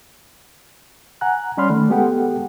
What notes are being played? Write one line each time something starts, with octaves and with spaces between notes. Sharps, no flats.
F#5 G#5 A#5 F#6
G3 C#4 D5 B5 C6 F6
D#3 A3
G#3 B3 G4 A4 F#5 G5